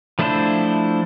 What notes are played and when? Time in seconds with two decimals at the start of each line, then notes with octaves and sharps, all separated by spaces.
0.19 F3 A3 D4 E4 C5